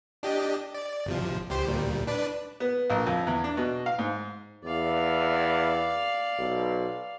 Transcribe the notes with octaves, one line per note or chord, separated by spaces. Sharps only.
D4 G4 D#5
D5
G1 C3 F3
C#2 G4 C5
D2 A#2 G3
D4 B4 D5
B3
A#1
F2
E2
D4
B2
F5
G#2
E2 D5 F5
B1